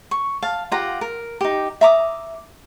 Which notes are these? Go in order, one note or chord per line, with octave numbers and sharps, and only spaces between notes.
C#6
F5 A5
F4 G4 F#5 A#5
A#4
D#4 G4
E5 A#5 D6 D#6